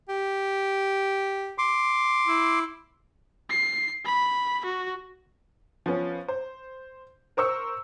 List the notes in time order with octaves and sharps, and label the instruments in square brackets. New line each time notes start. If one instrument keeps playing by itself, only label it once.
[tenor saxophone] G4
[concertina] C6 D6
[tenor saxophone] E4
[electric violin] C7
B5
F#4
[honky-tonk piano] F3 B3 C#4
C5
A#4 C5 C#6 E6 C#7